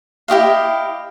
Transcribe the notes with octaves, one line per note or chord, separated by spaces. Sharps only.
E4 G4 D#5 F5